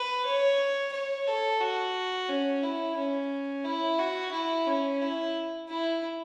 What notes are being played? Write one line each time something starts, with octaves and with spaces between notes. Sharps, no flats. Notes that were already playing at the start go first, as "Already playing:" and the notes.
Already playing: B4
C#5
C#5
A4
F#4
C#4
E4
C#4
E4
F#4
E4
C#4
E4
E4